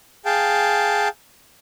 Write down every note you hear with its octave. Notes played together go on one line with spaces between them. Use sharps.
G#4 F5 G5 A5